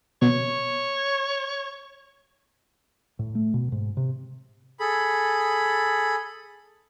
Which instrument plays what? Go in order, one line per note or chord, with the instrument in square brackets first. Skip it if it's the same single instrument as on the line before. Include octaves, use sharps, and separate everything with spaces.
[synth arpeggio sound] B2 [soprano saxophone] C#5
[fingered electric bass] A2
A3
B2
G#2
C3
[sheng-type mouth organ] G#4 A4 B5